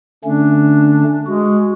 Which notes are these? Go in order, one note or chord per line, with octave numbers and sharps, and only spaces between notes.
D3 A3 C#4 D4
G#3 F#4